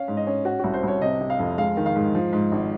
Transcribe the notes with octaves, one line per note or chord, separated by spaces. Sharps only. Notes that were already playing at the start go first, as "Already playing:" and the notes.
Already playing: C#4 F5
G#2
D#5
C#4
C#4 F#4
C2 F#4
C5
C2 C#5
C3 D#5
C3
F5
F2
G#3 F5
D#3
F5
G#2
F3
G#2
G#1